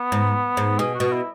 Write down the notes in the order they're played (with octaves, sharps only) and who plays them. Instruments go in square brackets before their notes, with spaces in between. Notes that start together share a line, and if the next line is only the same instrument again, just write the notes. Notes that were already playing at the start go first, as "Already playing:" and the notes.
Already playing: [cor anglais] B3
[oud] G#2
G#2
[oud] B2 [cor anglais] G#4
[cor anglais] F#4
[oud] B2
[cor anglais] E4